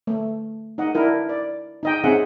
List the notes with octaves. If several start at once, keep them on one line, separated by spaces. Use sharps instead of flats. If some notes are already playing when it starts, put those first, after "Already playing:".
A3
D#4 D#5 F#5
D4 E4 A#4
D5
D#4 D#5 G5
C4 C#4 D#4 G#4 E5 F#5